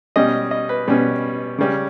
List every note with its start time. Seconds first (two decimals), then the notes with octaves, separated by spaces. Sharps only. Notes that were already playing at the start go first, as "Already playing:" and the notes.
0.16 B2 G3 C#4 D#5
0.51 D#5
0.69 B4
0.88 B2 G3 C#4 B4
1.58 C#3 G3 C#4